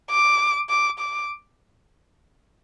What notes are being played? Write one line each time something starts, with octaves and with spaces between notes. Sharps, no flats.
D6
D6
D6